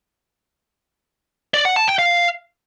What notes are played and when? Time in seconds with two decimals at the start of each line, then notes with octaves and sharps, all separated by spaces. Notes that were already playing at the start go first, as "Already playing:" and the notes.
1.54 D5
1.65 F#5
1.76 A5
1.88 G5
1.99 F5